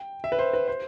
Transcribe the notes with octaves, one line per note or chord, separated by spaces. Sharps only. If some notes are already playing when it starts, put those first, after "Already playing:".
Already playing: G5
E5
B4
C5
B4
C5